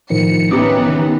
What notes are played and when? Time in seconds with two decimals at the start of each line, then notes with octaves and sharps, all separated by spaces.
0.10 A2 D#3 F3 C#7
0.51 E3 B3 C#4 D#4 G4 D6 D#6
0.89 D#3